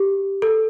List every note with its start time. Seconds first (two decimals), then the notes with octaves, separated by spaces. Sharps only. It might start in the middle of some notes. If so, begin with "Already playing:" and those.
Already playing: G4
0.42 A4